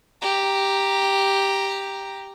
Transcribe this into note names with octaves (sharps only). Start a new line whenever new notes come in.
G4 A#5